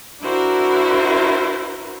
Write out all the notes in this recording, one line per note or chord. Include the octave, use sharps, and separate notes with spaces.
D4 E4 F#4 A#4 C5